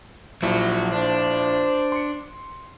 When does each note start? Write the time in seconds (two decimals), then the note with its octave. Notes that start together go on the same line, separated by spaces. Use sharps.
0.42 A#1 F3 F#3 E4
0.92 D4 C5
1.92 C6 C#7